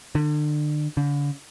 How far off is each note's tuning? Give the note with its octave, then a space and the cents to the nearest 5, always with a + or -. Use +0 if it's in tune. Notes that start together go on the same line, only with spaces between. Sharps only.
D3 +35
D3 -40